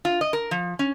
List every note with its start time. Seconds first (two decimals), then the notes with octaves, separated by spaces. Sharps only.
0.05 F4
0.21 D#5
0.33 A#4
0.51 F3
0.79 C#4